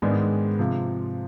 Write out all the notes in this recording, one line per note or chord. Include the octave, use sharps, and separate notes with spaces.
G#2 D#3 G#3 B3 D4
C3 F3